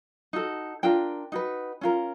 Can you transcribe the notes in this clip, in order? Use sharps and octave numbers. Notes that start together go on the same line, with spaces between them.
D#4 F#4 A4
D4 F4 A#4 G5
D#4 F#4 B4
C#4 F4 A#4